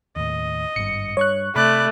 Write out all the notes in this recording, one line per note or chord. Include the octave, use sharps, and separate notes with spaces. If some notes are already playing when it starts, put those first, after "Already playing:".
D#2 A2 D#5
G#1 G2 C#7
G2 C#5 C#6 F#6
C3 A3 D5 B5 F#6